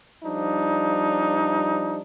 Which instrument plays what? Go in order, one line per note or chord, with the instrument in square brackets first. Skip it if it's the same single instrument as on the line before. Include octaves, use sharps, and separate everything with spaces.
[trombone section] F3 G3 D4 D#4